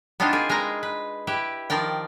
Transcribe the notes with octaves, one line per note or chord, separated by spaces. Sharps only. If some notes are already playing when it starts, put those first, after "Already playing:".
B3 C4 D4 D#4 F4
A#3 G#4
G#3 A#4 B4 A#5
B4
E4 G4 B4
D#3 F3 A#4 D5 G5